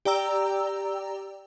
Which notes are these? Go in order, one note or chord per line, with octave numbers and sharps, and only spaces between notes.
G4 D5 G5 A#5 E6